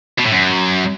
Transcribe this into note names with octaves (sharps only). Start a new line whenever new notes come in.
B2
A2
F#2